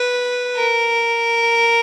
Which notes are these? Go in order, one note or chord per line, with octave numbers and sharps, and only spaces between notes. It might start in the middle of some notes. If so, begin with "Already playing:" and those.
Already playing: B4
A#4